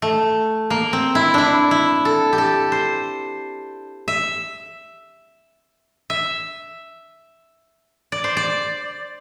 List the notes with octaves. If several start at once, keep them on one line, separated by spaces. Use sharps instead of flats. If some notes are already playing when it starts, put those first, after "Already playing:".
A3
A#3
C4
E4
D4 E4
E4
A4
G4
A4
C5
E5
E5
D5
C5
D5